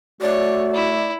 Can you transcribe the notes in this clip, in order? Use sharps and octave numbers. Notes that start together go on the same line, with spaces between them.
A3 F#4 C#5 D5
E4